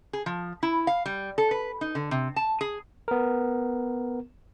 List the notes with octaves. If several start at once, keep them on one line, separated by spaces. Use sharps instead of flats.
G#4
F3
E4
F5
G3
A4
B4
D#4
D3
C3
A5
G#4
B3 A#4